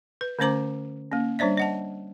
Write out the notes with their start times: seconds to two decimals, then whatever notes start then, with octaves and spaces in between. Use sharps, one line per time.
0.21 B4
0.39 D3 A3 C#4 C5 A#5 D6
1.12 A#3 C#4
1.39 G3 D4 C5 D5 E5
1.57 D#5 F#5 A5